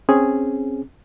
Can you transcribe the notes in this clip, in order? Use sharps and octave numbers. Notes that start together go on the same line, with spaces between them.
C4 C#4 G#4